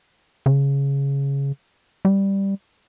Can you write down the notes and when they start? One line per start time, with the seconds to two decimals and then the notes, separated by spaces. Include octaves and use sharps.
0.46 C#3
2.05 G3